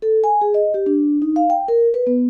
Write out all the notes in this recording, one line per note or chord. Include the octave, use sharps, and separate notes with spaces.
A4
G#5
G#4
D#5
G4
D4
D#4
F5
G5
A#4
B4
B3